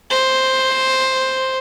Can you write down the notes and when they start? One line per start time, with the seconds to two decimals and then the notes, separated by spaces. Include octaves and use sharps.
0.11 C5